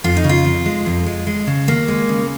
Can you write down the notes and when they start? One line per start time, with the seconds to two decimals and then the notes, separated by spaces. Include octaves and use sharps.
0.04 F2 F4
0.17 D#4
0.24 C#3
0.29 F4
0.45 F2
0.66 G#3
0.86 F2
1.06 G#3
1.27 G#3
1.47 C#3
1.68 D#2 A#3
1.88 G#3
2.09 C#3